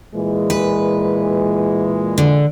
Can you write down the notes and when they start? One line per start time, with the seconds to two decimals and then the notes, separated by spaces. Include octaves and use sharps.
0.14 A#2 E3 G#3
0.50 B4
2.18 D3